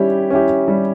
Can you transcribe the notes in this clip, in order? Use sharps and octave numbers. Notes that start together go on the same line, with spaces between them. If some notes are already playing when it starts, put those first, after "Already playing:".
Already playing: G3 C#4 E4 G4
C#4 E4 G4
G3